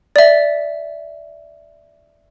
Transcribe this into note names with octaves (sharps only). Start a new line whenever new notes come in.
D5 E5